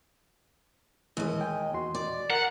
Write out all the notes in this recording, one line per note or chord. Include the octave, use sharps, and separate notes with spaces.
D#2 E3 G#3 D#5
G5 G#5
E2 F#4 C6
D5
A#4 F#5